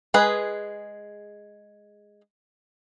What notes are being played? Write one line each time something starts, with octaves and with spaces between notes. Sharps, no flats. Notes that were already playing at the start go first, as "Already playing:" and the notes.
G#3 G#4 B4